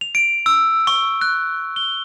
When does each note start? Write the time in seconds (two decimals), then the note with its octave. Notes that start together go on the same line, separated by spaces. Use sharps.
0.01 F7
0.15 D7
0.46 E6
0.87 C#6
1.21 F#6
1.76 G7